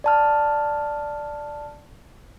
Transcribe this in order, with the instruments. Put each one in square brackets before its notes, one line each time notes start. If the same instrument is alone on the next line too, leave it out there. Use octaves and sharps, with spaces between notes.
[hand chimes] D5 A5 F6